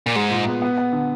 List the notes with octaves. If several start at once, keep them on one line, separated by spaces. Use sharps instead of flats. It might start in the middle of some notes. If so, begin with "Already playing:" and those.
A#2
G#2 G#3
A#2
B3
B3
B3
D3